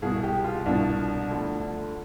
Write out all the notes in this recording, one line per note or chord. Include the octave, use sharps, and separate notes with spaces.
C2 B2 G#4
G4
F4
C2 B2 D4
D2 D3 F3